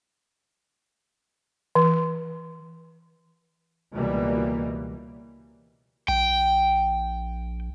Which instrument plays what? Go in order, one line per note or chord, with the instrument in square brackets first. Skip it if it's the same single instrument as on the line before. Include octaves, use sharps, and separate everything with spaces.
[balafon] E3
[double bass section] C#2 B2 E3 G3 A#3
[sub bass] A#1 [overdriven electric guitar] G5